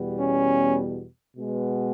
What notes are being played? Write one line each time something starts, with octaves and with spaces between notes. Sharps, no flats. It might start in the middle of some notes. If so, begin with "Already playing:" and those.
Already playing: E2 B2 G3 B3
C#4
B2 G#3 B3